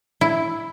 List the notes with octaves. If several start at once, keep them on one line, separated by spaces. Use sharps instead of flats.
E4